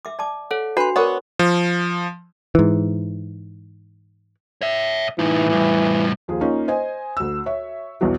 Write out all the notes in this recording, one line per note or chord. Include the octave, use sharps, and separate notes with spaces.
E5 D6
D5 A5 D6
A4 C#5 F#5
D4 F#4 B4 C6
B3 A#4 C#5 D5 F#5 D6
F3
G#2 E3
C#5 E5
A2 E3 D#4
A2 G3
D#2 F3 G#4
A#3 C#4 D#4 F4
C5 D#5 G#5
D2 E6
C#5 E5
B1 E2 E3 F#3